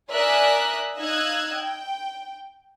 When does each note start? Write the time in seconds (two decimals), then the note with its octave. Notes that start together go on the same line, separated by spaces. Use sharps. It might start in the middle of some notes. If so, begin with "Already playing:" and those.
0.11 A#4 D5 E5 G#5 D#6 F#6
0.97 D#4 D#5 F5 E6 F#6 G#6
1.55 G5